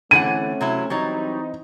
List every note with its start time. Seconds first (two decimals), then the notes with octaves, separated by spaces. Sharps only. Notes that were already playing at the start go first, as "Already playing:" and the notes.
0.11 D3 E3 A3 C4 C#4 F#5 D#7
0.61 C3 F#3 E4
0.90 E3 F#3 G3 C4 D#4 C#5